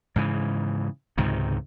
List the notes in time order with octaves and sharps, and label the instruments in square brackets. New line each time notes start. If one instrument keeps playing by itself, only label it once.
[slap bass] G#2 C#3 E3
C#2 G#2 C3 D#3